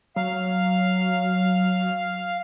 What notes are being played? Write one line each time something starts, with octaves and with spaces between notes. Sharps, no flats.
F#3 F5